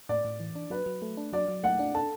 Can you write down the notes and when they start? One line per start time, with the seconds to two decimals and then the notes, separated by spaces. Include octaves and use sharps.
0.09 A2 D5
0.24 A2
0.40 E3
0.55 D4
0.70 F#3 B4
0.86 F#3
1.02 A3
1.17 D4
1.33 F#3 D5
1.48 F#3
1.63 A3 F#5
1.79 D4
1.95 A4 A5